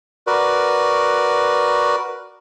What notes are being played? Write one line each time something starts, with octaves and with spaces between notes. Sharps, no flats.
F#4 A#4 B4 D5